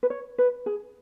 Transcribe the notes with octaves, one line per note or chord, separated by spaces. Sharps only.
B4
C#5
B4
G#4